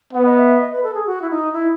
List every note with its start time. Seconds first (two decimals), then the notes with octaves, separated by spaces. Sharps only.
0.13 B3 F#5
0.25 D#5
0.37 E5
0.60 D#5
0.72 B4
0.84 A4
0.94 G#4
1.06 F#4
1.22 E4
1.30 D#4
1.53 E4